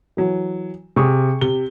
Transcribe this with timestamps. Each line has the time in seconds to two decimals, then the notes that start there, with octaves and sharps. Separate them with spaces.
0.17 E3 F#3
0.96 C3 G#4 C#6 D#6
1.41 C3 G7